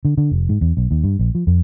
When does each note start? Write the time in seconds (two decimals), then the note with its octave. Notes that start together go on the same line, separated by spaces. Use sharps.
0.05 D3
0.18 D3
0.31 F1
0.49 G#2
0.61 E2
0.77 B1
0.91 D#2
1.04 G2
1.19 A#1
1.35 F3
1.47 F2